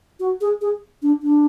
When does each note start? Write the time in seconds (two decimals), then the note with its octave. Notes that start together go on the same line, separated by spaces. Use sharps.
0.20 F#4
0.41 G#4
0.61 G#4
1.02 D4
1.23 D4